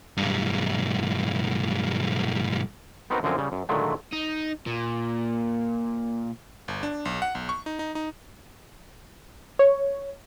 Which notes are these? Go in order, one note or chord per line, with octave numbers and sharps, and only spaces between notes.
B1 G2
B3 C4 D#4 F#4 A#4 B4
F#2 D3 F3 C4 A#4 G#5
C#3 G3
F#2
A#2 D3 D#3 F#3 G#3 A3
D#4
A#2
G1
D4
B1
F#5
B1
C#6
D#4
D#4
D#4
C#5